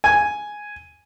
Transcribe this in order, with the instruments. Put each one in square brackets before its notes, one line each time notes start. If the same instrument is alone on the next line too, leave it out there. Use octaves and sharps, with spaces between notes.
[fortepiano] G#5